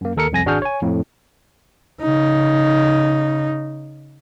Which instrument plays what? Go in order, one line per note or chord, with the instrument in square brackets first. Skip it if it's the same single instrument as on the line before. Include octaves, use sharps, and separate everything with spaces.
[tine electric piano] F#2 A#3
D#2 A4 A#4 C#7
C2 F2 G#5 A#6
G#1 D4 F#4 G#4 F6 G6
C#5 G#5
F2 A2
[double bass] C#3 D#4